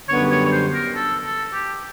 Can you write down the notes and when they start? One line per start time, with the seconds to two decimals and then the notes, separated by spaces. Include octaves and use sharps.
0.09 F#2 D3 G3 B3 C#5
0.31 C#5
0.46 C#5
0.52 C5
0.74 A#4
0.96 A4
1.24 A4
1.53 G4